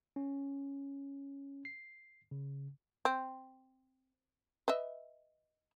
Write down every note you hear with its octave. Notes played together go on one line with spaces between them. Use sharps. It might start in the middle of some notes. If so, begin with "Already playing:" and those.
C#4
C7
C#3
C4
B4 D#5 E5